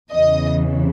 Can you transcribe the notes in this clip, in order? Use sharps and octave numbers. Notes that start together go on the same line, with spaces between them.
E2 C#3 E3 D#5